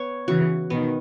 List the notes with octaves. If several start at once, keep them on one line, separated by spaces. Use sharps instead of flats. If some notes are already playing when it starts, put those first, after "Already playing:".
Already playing: B3 C#5
C#3 E3 F#4
B2 D#3 B3